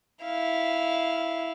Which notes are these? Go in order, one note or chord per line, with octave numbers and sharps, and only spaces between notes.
E4 F5